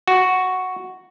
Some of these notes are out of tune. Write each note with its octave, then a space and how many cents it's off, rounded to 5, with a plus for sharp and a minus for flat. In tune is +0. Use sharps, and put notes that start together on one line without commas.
F#4 +0